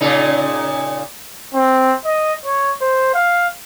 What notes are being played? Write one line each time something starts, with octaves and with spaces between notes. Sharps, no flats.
A#2 C#3 D#4
C4
D#5
C#5
C5
F5